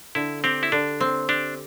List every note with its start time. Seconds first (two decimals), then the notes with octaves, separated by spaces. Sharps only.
0.15 D3 E4
0.44 C4 G4
0.63 E4
0.72 D3 D4
1.00 C4
1.29 D4 G4